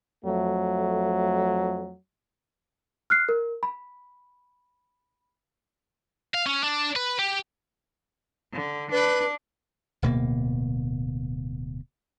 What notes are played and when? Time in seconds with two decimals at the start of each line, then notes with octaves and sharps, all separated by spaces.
0.25 F2 F#3 A3
3.10 F6 F#6 C7
3.29 A#4
3.63 B5
6.34 F5
6.47 C#4
6.64 D4
6.96 B4
7.19 G4
8.53 D3
8.92 D4 B4
10.02 D1 B2 A#3